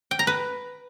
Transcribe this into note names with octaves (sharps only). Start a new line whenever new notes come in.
G5
A#5
B4